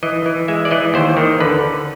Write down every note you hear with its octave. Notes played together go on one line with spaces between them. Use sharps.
E3 D#5
E3
G#3 E5
D5
E3 D#5
D#2 C5
D#3
D3 B4